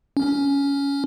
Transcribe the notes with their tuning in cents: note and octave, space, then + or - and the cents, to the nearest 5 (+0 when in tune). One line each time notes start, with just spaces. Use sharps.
C#4 +15